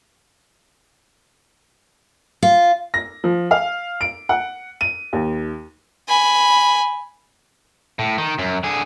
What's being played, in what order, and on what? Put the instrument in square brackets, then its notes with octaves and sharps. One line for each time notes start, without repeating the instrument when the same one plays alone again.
[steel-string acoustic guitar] F4
[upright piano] A#6
F3
F5
D7
F#5
D#7
D#2
[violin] G#5 B5
[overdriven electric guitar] A2
D#3
F#2
D3 G#4